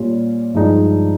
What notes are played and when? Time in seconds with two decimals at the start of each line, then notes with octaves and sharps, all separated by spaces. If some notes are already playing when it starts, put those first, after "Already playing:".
Already playing: A#2 G3 C#4 F4
0.54 G2 F3 G#3 D#4